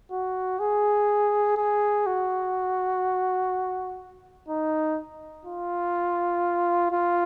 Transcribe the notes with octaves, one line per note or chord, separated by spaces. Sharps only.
F#4
G#4
G#4
F#4
D#4
F4
F4